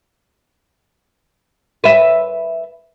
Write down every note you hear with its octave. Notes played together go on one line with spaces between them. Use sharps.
B4 E5